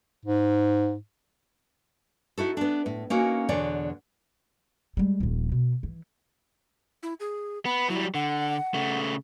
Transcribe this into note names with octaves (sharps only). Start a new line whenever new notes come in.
G#2
D#4 E4 F#4 A4
B3 D4
A2
A#3 C#4 D#4 F#4
E2 B2 D3 B3 C#5 D5
G3 G#3
D#1 F3
B2
E3
E4
G#4
B3 B5
F#3 G3 E4
D3 F#5
C#3 A3